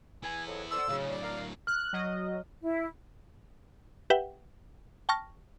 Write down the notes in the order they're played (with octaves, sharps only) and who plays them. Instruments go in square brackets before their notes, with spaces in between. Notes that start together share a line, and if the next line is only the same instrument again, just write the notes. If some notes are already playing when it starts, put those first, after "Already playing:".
[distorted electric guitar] B3 E4 [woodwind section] G#5
[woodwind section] F2 F#3
[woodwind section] A4 C5 D5 [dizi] E6
[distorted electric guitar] A2 F#3 [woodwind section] C#3
[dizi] D5
[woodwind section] A#4 F5
[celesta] F6 [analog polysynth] F#6
[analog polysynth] F#3 D#5
[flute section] E4
[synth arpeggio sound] G4 B4 E5 F#5 G5
G5 A5 C#6 F6 A#6